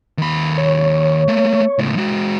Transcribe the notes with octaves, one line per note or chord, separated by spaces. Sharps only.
D#2 B5
C#5
A3 A#3
C#2 A2
G#3 F#4